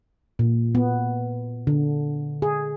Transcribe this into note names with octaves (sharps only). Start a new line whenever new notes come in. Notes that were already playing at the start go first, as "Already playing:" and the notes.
A#2
B3
D3
G#4